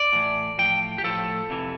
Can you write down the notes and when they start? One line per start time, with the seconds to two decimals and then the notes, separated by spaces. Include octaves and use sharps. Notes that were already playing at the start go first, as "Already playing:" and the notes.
Already playing: D5
0.13 A2 E3
0.58 A2 F3 G5
0.98 G4
1.04 A2 F3 A4
1.50 F2 C3 E3